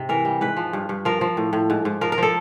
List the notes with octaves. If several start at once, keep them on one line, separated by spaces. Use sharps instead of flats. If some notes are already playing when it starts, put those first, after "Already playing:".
Already playing: G#2 C3
E3 A#4
G3
G#2 B4
F3
G2
G2
F3 A#4
F3
A2
A2
G#2
G#2
F3 A#4
A#4
F3 A4